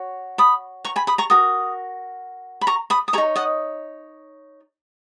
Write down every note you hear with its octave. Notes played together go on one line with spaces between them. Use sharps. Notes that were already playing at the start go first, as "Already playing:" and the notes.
Already playing: F#4 C#5
B5 D#6
A#5 C#6
G#5 B5
B5 D#6
A#5 C#6
F#4 A#4 D#6
B5
A#5 C#6
B5 D#6
D#6
D#4 G#4 C#5 A#5 C#6
D#5 F#5